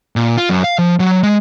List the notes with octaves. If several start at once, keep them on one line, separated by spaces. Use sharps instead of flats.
A#2
F4
F#2
F5
F3
F#3
G#3